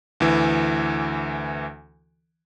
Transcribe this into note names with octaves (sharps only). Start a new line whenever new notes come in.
D2 E3